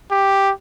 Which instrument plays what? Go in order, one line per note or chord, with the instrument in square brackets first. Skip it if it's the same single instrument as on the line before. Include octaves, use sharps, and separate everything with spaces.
[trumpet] G4